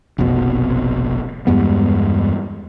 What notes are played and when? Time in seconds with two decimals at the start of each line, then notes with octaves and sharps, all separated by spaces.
0.18 F1 A#1 F2 B2
1.47 E2 G2 G#3 B3